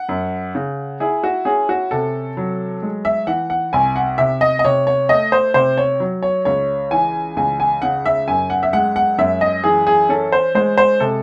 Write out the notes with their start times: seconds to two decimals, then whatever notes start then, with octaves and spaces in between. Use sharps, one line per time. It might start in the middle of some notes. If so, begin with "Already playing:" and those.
Already playing: F#5
0.09 F#2
0.55 C#3
1.00 E4 G#4
1.24 F#4
1.45 C#4 G#4
1.69 F#4
1.91 C3 A4
2.37 F#3
2.82 G#3
3.05 E5
3.27 E3 F#5
3.50 F#5
3.73 C2 G#5
3.96 F#5
4.18 C3 E5
4.41 D#5
4.59 D#5
4.65 C3 C#5
4.87 C#5
5.09 A3 D#5
5.32 C5
5.54 C3 C5
5.78 C#5
6.00 F#3
6.23 C#5
6.45 C#2 C#5
6.91 E3 G#5
7.37 C#2 G#5
7.60 G#5
7.82 C#3 F#5
8.06 E5
8.28 F#2 G#5
8.50 F#5
8.63 E5
8.73 G#3 F#5
8.96 F#5
9.18 F#2 E5
9.41 D#5
9.64 E3 G#4
9.87 G#4
10.09 C#4 A4
10.32 C5
10.55 G#3 C5
10.78 C5
11.00 C3 A4